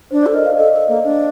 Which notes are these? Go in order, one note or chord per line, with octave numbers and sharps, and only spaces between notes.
D4 C5
D5
A4
A#4 D#5
F5
A4 D#5
A4
A#3
D4